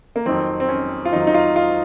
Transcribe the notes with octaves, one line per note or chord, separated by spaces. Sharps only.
A#3
F2 D#3 F#3 C4
C4
C#4
F4
F2 D#3 F#3 D#4
D#4
F4
F4